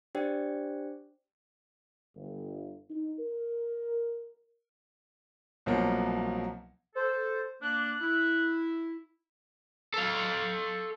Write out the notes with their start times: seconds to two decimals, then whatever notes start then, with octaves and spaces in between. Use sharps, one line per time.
0.15 D4 G4 C5 D5 G5
2.16 G1
2.90 D#4
3.19 A#4
5.66 C2 B2 F3 F#3 A#3
6.95 A4 C5
7.62 A#3 D4 F#6
8.01 E4
9.94 A4 F5